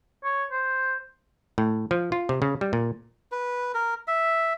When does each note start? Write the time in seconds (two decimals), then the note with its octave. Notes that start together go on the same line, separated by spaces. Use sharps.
0.24 C#5
0.51 C5
1.58 A2
1.91 F3
2.12 F4
2.29 C3
2.42 C#3
2.61 G3
2.73 A#2
3.32 B4
3.74 A#4
4.08 E5